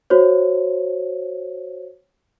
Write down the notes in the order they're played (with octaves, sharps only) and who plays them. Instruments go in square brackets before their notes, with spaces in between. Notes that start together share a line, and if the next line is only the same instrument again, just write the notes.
[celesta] F#4 C5 C#5